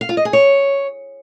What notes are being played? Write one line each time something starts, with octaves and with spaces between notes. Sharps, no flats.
F5
F4
D#5
G#4
C#5